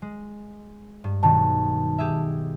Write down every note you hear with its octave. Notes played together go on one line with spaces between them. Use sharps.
G#3
G2
B1 B2 D#3 A5
G4 G#4 E5